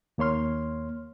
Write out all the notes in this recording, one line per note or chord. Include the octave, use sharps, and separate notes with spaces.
D#2 A#3 C#5 C6 F6